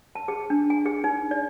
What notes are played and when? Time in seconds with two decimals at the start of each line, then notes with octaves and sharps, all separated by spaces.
0.15 A5
0.28 G#4
0.50 D4
0.70 G#5
0.85 G#4
1.04 D#4
1.31 D5